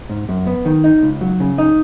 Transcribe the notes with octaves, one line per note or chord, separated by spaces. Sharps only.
G#2
F#2
B3
D#3
D#4
C#2
F#3
C#3
D#4